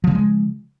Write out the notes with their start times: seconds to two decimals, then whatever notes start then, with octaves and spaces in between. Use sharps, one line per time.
0.04 F3
0.07 C#3
0.11 A3
0.15 G#3